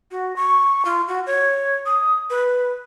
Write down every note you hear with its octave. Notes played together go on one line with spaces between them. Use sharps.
F#4
C#6
F4
F#4
C#5
D#6
B4